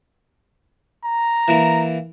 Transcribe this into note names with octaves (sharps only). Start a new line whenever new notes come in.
A#5
E3 A#3 E4